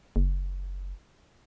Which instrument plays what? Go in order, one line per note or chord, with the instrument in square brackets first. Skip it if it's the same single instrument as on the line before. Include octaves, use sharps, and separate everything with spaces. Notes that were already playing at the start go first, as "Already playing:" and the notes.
[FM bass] F#1